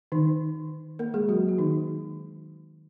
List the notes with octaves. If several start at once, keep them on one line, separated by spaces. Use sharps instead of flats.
D#3 D#4
A#3 A#4
G#3 G#4
F#3 F#4
F#4
D#3 D#4